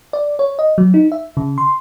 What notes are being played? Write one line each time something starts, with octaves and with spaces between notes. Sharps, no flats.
D5
C#5
D#5
F#3
D#4
E5
C#3
C6